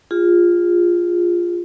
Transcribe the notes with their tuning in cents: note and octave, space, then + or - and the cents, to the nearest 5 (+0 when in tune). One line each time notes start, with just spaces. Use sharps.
F4 +0 G#4 -30